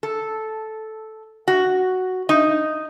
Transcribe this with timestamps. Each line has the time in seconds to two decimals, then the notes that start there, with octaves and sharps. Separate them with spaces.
0.03 A4
1.48 F#4
2.29 D#4